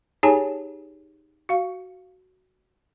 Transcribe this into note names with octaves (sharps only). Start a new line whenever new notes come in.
D#4 G4 G#4 C#5 G#5 A5
F#4 F5